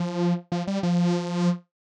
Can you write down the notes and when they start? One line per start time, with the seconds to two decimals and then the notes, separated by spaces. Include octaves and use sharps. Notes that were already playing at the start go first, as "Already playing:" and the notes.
Already playing: F3
0.52 F3
0.67 G3
0.83 F3